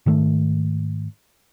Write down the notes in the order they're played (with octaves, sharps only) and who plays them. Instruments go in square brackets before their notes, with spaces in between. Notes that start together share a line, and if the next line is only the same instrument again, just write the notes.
[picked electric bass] G#2 D#3 A3